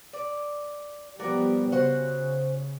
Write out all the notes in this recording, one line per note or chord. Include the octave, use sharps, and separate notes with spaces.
D5
F3 G3 B3 F#4 A#4 D5
C#3 F#4 C5 F#5